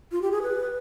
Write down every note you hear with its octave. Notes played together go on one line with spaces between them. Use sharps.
F4
G4
G#4
B4